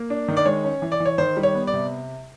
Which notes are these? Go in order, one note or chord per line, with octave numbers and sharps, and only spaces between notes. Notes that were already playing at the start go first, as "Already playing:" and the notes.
Already playing: A#3
D4
D#3
D5
G#3 C#5
C#4
E3
D5
E3
C#5
D#3 C5
G3
C#5
B3
D5
C3